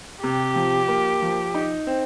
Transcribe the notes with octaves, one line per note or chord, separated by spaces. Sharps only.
C3 G4
F3
A#3
F3
D#4
C4